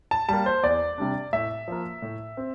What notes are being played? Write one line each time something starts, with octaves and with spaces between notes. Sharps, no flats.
A5
G3 A#3 A5
C5
E2 D5
C3 G3 D4
A2 E5
F3 A#3
A2
C4